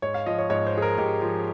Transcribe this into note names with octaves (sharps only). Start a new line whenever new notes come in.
G#2 C#5
F5
F3 D#5
C#5
G#2 C#5
C5
F3 G#4
A#4
G#2 G4
F3